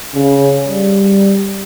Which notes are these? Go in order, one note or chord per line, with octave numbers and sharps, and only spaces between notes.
C#3
G3